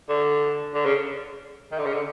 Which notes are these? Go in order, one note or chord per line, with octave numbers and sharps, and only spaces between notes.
D3
D3
C#3
D#3
D3
C#3
D3